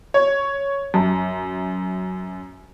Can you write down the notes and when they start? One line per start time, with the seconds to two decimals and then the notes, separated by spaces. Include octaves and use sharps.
0.14 C#5
0.94 F#2